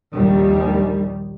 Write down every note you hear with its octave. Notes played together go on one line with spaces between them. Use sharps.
A#1 D#2 D#3 G3